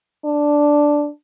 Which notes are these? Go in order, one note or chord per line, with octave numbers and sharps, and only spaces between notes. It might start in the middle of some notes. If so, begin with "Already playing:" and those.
D4